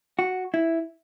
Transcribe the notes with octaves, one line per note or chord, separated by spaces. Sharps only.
F#4
E4